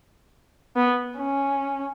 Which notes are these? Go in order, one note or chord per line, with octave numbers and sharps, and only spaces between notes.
B3
C#4